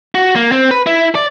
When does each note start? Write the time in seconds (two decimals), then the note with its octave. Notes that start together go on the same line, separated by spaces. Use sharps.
0.15 F#4
0.35 A#3
0.52 C4
0.71 B4
0.86 E4
1.15 D5